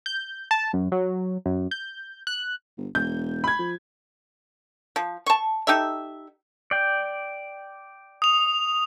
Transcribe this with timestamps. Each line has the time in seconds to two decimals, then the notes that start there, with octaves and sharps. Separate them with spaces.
0.06 G6
0.51 A5
0.73 F#2
0.92 F#3
1.46 F#2
1.71 G6
2.27 F#6
2.78 G1
2.95 E1 G6
3.44 B5 G#6
3.59 F3
4.96 F3
5.26 A5 C#6
5.67 D#4 G4 A4 E5
6.71 D5 G5
8.22 D#6 F7